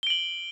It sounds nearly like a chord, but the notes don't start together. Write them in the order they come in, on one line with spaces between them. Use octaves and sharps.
G7 D7 F#7